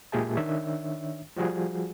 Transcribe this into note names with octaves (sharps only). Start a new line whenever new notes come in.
A#2 G#3 G4 G#4 E5 A5
D#3 D4 C#5 E5
F3 G3 F#4 G#4